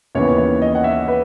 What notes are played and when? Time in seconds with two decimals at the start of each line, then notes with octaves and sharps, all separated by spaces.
0.15 D#2 C#3 E3 B3 C#5
0.38 C#5
0.62 D#5
0.75 F#5
0.84 E5
1.08 B4